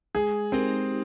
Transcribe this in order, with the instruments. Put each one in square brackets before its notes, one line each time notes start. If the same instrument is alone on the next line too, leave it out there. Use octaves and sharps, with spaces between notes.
[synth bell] G#3 [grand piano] G#4
[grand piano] C4 [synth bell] D#4 G4 A#4